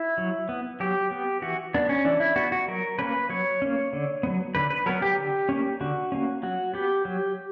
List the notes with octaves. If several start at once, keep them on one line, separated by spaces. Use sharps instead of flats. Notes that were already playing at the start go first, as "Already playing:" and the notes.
Already playing: E4
F#3
B3
F#3 G4
B3
E3 F#4
B3 D4
C#4
E3 D4
E4
B3 F#4
F#4
F#3 A#4
A#3 C#4 B4
F#3 C#5
A#3 C#4
D3
F#3 B3
D3 B4
B4
F#3 B3 A#4
G4
D3
A#3 C#4
D3 F#4
A#3 C#4
F#3 F#4
B3 G4
F#3